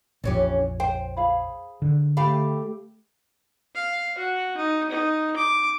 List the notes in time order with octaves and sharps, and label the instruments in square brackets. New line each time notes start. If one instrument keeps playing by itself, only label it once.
[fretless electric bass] A#1 F2 [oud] E3 C#4 G4
[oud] C5 [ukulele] G5
[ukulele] G#4 F5 B5
[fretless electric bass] D3
[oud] A3 G4 F5 [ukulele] B5
[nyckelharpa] F5
F#4
D#4
D#4
D6